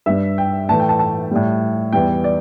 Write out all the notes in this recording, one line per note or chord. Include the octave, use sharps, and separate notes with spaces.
G2 G3 E5
G5
A2 E3 A3 A5
G5
A5
A5
A2 G3
E2 E3 G3 G5
D5